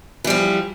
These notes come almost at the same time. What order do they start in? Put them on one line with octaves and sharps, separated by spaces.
E3 G3 F3